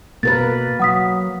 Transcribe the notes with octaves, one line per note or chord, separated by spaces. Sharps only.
B2 A#3 A#4 B4 A6
F#3 F#5 D#6 B6